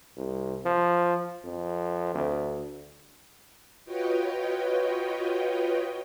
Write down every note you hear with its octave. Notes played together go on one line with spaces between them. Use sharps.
C2
F3
F2
D2
F4 F#4 B4 C#5 D#5 G5